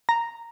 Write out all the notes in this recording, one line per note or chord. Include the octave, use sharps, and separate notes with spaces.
A#5